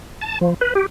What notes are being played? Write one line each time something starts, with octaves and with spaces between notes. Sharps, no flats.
A5
F3
B4
G4